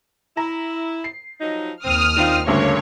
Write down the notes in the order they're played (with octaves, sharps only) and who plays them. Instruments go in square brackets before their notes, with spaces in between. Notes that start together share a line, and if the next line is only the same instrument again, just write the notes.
[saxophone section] E4 [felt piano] A#5
[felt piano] C7
[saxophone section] F3 F#3 D#4
[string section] D#2 D#6 F6 [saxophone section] C4
[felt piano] D#3 F4 [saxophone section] C4 D4 D#4
[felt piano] D2 G2 C#3 [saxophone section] A3 A#3 [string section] C#5